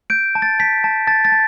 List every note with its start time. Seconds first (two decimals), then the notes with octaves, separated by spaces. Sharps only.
0.10 G6 D7
0.35 A5
0.42 A6
0.60 A5 B6
0.84 A5
1.07 A5 A6
1.25 A6
1.32 A5